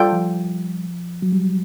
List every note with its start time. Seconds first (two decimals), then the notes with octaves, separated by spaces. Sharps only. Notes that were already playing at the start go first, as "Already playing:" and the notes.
Already playing: G3 F4 A4 D5 G5
0.13 F3
1.22 F#3
1.33 G3